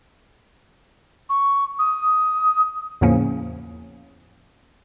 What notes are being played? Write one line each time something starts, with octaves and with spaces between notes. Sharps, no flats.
C#6
D#6
E2 A2 C#3 F3 A#3 C#4